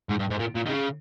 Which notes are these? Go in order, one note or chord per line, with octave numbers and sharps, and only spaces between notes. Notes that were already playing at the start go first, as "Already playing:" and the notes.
G#2
G2
G#2
A#2
A#2
D#3
C#3